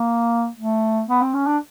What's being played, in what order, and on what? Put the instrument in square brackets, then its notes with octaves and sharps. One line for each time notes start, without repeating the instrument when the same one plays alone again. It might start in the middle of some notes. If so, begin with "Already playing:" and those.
Already playing: [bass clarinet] A#3
A3
B3
C4
C#4
D4